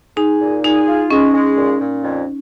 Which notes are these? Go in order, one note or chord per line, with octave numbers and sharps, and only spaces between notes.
D#4 G#4
A#2
D#4 G#4
F4
G#3 C#4
G#3
A#2
A#2
F2